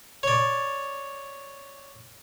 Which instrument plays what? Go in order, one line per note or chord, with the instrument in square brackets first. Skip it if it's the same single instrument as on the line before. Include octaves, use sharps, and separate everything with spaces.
[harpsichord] C#5 D5